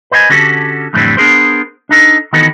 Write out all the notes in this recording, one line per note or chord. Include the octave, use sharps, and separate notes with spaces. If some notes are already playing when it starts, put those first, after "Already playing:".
B4 C5 D#5 F5 G#5
D3 C#4 F#4 G4 A4
F2 A2 D3 E3 G3 C4
B3 D4 G#4 A#4 C5
D4 D#4 A4
D#3 E3 B3 D#4 F#4 A4